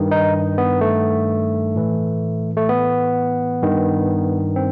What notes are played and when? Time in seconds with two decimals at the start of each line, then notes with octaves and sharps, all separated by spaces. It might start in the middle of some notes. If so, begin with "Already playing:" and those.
Already playing: G2 D#3
0.11 D#4
0.58 B3
0.81 A3
1.75 A2 E3
2.57 A3
2.69 B3
3.63 G2 D#3
4.56 C4